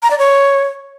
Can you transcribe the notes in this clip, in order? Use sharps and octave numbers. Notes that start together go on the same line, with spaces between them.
A#5
D5
C#5